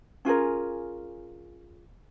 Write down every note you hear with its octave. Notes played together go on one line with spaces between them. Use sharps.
C#4 F4 G#4 A#4